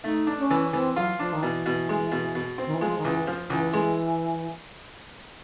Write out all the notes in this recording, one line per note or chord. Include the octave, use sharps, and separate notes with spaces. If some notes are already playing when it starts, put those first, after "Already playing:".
A3 D#4
D4
C#4
E3
E3 C4
F#3 F4
F3 D4
D#3
B2 E3
B2
G#3
B2
B2
C4
D#3
E3
F3 G#3
D#3
C#2 E3
F3
C#2 E3
G#3